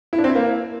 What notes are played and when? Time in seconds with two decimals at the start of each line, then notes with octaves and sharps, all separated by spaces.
0.13 E4
0.18 D4
0.24 C4
0.30 E4
0.35 A#3